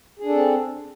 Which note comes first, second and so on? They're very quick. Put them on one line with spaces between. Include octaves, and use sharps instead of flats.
G#4 D4 A4 C4